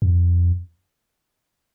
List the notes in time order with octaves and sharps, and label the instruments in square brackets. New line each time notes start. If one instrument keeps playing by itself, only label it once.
[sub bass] F2